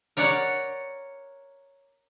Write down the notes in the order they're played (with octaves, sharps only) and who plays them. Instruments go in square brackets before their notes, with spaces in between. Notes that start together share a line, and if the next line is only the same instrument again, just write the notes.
[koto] A#4 C#5 D5 F#5